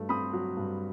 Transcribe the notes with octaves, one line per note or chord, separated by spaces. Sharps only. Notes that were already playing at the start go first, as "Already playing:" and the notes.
Already playing: G2 F#3 A3
C4 B5 D#6
F#3
G2